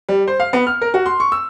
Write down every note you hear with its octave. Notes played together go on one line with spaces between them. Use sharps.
G3
C5
F5
B3
F6
A#4
F#4
C6
C#6
E6